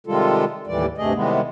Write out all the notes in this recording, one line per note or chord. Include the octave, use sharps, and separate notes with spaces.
C3 D#3 G3 G#3 F4 A4
D#2 A2 E3 G3 D5
D2 G2 C3 A3 G#4 D#5
C3 D#3 E3 G3 G#3 B3